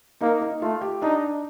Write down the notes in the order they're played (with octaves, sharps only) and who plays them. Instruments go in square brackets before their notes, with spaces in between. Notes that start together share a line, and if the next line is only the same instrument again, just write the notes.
[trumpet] A#3 [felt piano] D#4
[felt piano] D#4
[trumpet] A3 [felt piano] F4
[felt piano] G4
[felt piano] D4 [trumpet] D#4